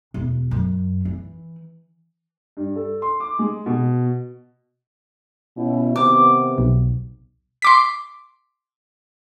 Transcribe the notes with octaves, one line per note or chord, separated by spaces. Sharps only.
E1
F#2
E3
G2
A4
C6
D6
G#3
B2
B2 C#4 E4
C3 D#3 B3 D6
B1
C6 D6 B6